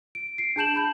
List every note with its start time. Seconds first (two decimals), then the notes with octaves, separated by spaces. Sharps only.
0.15 D7
0.38 C7 D7
0.56 D4 G#4 A5 G6 E7 F#7
0.75 A5 B5 G6